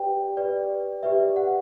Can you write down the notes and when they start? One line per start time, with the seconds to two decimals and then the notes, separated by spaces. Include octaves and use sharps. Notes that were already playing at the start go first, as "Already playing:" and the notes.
Already playing: G4 B4 D5 G5
0.37 G4 B4 D5
1.03 G4 B4 D5 E5
1.36 F#5